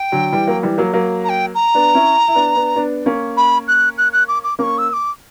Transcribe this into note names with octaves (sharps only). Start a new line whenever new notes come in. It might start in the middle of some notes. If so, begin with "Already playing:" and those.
Already playing: G5
D3 F#3
E3 G3
F#3 A#3
E3 G3
F#3 A#3
F#3 A#3
A#5
G5
A#5
B3 D4
C#4 E4
E4
B3 D4
B3 D4
B3 D4
A#3 C#4
B5
F#6
F#6
F#6
D6
D6
A#3 C#4 C#6 D6
E6
E6
D6